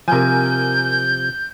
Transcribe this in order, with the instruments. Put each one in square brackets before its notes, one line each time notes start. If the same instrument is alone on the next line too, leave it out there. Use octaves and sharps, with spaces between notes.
[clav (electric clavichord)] C3 F3 [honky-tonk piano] A#4 G#5 [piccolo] G6